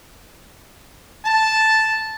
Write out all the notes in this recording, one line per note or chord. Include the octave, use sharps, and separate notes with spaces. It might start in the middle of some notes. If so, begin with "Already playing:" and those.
A5